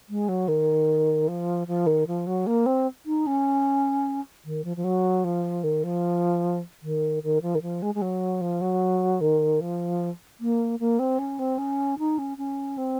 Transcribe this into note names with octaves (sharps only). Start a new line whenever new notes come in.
G#3
F#3
D#3
F3
F3
D#3
F3
F#3
A#3
C4
D#4
C#4
D#3
F3
F3
F#3
F3
D#3
F3
D#3
D#3
F3
D#3
F3
G#3
G#3
F#3
F3
F#3
D#3
F3
A#3
A#3
C4
C#4
C4
C#4
D#4
C#4
C#4
C4